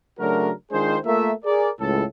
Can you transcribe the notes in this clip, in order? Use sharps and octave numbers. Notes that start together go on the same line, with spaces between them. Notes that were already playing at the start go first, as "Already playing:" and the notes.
C#3 F#3 A3 D4 F#4 A#4
D#3 G#3 D4 F4 G#4 C5
A3 A#3 F4 A#4 E5
G#4 A#4 D5
C#2 A2 A4